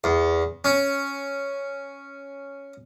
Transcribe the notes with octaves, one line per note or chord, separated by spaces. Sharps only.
E2
C#4